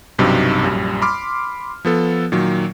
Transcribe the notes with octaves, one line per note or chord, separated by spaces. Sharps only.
B1 G2 C3 F#3 D#4
A#1 F#2 G3
B5 C6 D6 F6
F3 B3 A4
A#2 D#3 F#3